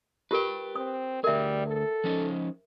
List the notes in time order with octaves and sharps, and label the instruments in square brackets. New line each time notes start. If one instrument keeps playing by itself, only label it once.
[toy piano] F4 G4 A#4 [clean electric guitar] B4 G5
[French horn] C4 [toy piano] D#6
[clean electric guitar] D2 G#4 [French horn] G3 [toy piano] A#4 E5
[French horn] A4
[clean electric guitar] F3 C#4 D#4